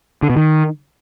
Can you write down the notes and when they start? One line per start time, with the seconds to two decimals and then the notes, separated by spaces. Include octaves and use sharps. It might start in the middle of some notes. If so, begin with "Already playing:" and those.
0.23 D3
0.30 B2
0.37 D#3